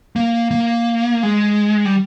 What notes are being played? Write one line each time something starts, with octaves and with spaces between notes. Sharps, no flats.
A#3
A#3
G#3
G3